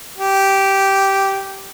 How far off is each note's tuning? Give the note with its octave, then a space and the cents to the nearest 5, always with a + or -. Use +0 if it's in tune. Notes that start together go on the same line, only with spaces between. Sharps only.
G4 -10